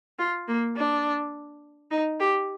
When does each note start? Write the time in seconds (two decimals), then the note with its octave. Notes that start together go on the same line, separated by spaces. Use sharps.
0.19 F4
0.48 A#3
0.77 D4
1.91 D#4
2.20 G4